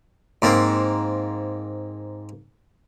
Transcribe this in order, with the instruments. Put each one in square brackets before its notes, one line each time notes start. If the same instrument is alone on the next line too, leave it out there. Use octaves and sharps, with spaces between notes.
[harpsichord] G#2 A#3 C4